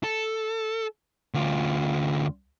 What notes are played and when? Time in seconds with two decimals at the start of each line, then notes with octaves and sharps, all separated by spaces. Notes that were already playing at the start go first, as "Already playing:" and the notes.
0.04 A4
1.34 D2 F4